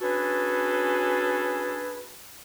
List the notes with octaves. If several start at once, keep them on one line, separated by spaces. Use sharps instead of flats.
C#4 D4 F#4 G#4 A4 B4